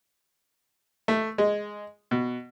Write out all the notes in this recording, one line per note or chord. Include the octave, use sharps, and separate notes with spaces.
A3
G#3
B2